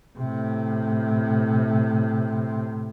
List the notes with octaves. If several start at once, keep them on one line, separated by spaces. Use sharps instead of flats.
A2 C3